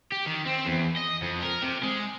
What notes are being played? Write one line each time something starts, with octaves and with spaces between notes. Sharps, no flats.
G4
D#3
C4
E2
D#5
F2
A#4
C3
G#3